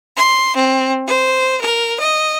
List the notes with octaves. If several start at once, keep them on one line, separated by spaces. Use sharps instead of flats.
C6
C4
C5
A#4
D#5